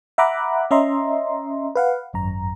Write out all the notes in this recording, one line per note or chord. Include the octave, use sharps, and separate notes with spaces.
E5 F#5 A#5 B5 D6 F#6
C#4 D#5 E5 A#5 C6
B4 F5 F#5
G#1 F#2 A#5